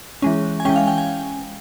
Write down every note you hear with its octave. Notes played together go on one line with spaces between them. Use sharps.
E3 G#3 C#4
G#5
E3 G#3 C#4 G5
F5
G5
G#5